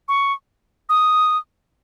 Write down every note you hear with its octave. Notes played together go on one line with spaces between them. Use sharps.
C#6
D#6